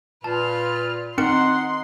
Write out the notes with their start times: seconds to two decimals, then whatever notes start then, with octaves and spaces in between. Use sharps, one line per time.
0.24 A#2 F4 B4 A5 F6
1.18 C4 D#4 A#4 F#5 C6 C#7